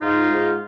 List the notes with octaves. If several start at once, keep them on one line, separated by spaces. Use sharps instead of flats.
G#2 D#4 F4
G#2